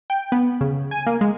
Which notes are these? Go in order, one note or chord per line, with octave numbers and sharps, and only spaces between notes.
G5
B3
C#3
G#5
A#3
G#3